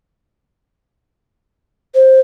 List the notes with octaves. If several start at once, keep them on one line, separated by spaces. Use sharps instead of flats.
C5